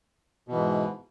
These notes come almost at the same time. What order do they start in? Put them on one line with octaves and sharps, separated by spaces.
B2 E3 G#2